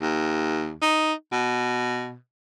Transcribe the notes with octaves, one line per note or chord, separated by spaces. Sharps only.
D#2
D#4
B2